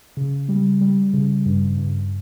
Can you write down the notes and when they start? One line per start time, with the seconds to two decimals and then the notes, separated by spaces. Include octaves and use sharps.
0.17 C#3
0.49 G3
0.81 G3
1.13 C#3
1.46 G2
1.78 G2